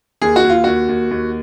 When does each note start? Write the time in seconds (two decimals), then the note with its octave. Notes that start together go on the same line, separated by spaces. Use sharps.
0.22 D#2 G#4
0.36 F#4
0.44 D#2
0.50 F4
0.64 D#2 F#4
0.89 D#2
1.11 D#2